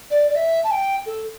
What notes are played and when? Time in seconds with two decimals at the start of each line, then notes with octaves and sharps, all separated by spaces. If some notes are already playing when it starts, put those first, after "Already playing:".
0.11 D5
0.30 D5
0.35 E5
0.64 A5
0.71 G5
1.06 A4